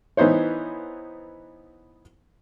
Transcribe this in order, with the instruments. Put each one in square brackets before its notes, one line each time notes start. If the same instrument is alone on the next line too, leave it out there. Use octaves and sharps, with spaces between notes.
[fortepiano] E3 B3 D#4 C5 C#5